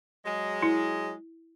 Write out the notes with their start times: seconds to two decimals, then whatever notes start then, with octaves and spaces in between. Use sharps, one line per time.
0.25 F#3 G#3
0.62 E4